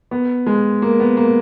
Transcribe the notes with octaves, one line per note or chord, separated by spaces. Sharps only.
B3
G#3
A#3
B3
A#3